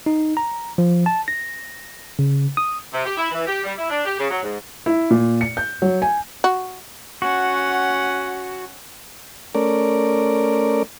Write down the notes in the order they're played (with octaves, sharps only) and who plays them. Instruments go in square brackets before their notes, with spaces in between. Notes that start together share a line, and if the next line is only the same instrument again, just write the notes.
[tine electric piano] D#4
A#5
F3
A5
A#6
C#3
D#6
[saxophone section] C3
G4
E4
E3
G4
G3
E4
D4
G4
C#3
F#3
G#2
[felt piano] E4
A#2
C#7
G6
F#3
G#5
[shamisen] F#4
[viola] C#4 F#5 [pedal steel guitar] F#4
[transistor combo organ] A3 C#4 A#4 D5